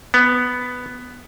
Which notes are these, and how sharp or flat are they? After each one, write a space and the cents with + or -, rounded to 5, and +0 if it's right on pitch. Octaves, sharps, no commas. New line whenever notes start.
B3 +5